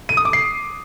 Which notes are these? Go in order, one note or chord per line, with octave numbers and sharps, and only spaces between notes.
D#7
D#6
D6
C7